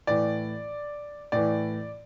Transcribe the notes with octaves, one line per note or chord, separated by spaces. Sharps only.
A2 E3 D5
A2 E3 D5